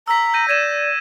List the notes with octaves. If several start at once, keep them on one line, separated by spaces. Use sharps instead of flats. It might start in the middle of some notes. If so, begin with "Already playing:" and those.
A#5 E6 B6
G6 A#6 D#7
D5 G#6 D#7 E7